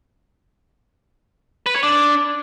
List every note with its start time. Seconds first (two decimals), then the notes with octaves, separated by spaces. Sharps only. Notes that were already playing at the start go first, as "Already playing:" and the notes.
1.66 B4
1.75 C#5
1.83 D4